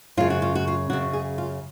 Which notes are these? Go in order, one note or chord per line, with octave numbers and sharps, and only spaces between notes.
F#2 C#3 F4
F#4
F4
F#4
F4
F#2 C#3 F#4
G#4
F4